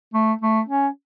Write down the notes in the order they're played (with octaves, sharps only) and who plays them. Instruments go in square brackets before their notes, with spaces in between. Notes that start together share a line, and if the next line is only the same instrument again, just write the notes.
[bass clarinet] A3
A3
C#4